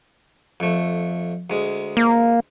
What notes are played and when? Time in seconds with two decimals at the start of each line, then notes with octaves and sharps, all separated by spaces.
0.60 F2 A3
1.50 D2 G#3
1.97 A#3